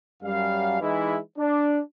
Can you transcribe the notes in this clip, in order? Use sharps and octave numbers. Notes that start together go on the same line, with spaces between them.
F#2 G3 F5
E3 G#3 D#4 E4
D4